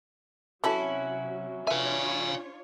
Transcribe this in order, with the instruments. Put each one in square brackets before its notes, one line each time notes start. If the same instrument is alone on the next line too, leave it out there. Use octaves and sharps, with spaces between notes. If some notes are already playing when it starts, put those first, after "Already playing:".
[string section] C3 F#3 [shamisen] E3 A4 [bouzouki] C#4 E4 F#4
[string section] D4 F4 C#5 [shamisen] B4 E5 [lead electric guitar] F5 G#5